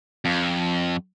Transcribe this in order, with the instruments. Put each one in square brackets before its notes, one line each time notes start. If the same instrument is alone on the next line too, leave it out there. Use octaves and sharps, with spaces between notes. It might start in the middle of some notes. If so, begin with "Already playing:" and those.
[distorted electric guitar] F2